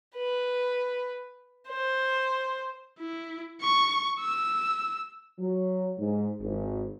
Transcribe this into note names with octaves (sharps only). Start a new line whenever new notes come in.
B4
C5
E4
C#6
E6
F#3
G#2
G#1